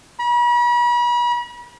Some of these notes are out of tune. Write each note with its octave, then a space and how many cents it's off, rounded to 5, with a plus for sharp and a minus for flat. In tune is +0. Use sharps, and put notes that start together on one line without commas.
B5 -40